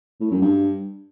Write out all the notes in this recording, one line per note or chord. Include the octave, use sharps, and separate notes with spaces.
A2
F#2
G2